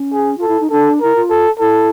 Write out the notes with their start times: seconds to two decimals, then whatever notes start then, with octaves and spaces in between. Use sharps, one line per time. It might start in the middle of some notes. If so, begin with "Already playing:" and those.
Already playing: C#4
0.13 G#4
0.38 F4 A4
0.48 E4
0.60 D#4
0.71 D4 A4
1.01 E4 A#4
1.16 F4
1.30 A4
1.59 E4 A4